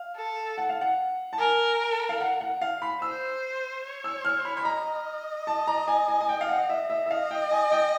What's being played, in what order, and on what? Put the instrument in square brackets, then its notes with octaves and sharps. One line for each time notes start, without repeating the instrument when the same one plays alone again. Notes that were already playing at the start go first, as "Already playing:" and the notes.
Already playing: [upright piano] F5
[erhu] A4
[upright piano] F#5
F5
F#5
A5
[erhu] A#4 [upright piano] G#5
[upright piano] F5
F#5
F#5
F5
B5
[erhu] C5 [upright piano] E6
[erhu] C#5
[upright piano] E6
F6
B5
B5
[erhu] D#5 [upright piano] A#5
[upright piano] A5
A#5
G#5
G#5
G#5
G5
F5
F#5
E5
E5
E5
[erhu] D#5 [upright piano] F5
[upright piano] G5
G#5
G5